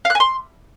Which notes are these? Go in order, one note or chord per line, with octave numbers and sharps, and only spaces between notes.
F5
F#6
G#5
C6